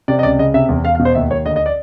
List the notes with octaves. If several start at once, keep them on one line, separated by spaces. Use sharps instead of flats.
C3 D5
D#5
C#2 D5
C#3 D#5
C3 E5
E2
E2 F5
F5
B2
C5
D#2 E5
D#2 C#5
D2 D#5
D#5
D5